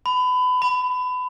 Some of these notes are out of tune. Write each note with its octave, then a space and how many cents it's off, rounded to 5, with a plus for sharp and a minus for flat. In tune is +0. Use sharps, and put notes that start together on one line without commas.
B5 +25
B5 -5